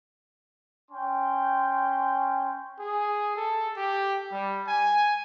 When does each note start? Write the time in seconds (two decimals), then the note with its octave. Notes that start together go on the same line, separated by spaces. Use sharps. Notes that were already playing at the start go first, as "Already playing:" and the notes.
0.90 C#4 G5 C6
2.79 G#4
3.36 A4
3.77 G4
4.32 G3
4.67 G#5